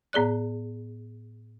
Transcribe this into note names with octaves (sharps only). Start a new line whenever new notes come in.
A2 B3 G#4 D5 F#6